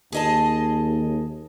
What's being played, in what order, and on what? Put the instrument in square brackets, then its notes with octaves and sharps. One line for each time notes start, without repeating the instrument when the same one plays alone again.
[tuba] D#2 [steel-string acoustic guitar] G#4 D#5 A5